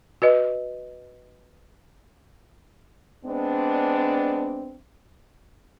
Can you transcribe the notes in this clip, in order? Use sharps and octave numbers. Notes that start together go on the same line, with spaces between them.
F#4 B4 D#5
G#3 B3 C4 D4